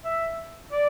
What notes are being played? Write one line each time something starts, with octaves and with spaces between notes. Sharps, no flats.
E5
D5